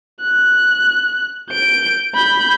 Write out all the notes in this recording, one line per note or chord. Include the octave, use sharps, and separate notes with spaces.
F#6
G6 D7
B5 G6